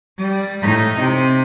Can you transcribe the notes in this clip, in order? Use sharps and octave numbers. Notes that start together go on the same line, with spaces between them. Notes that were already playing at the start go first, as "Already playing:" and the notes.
G3
A2 D#4
C3